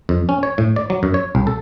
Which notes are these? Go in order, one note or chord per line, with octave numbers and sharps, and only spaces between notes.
F2
C#4
C#5
A2
D5
F#3
F#2
C#5
C2
A4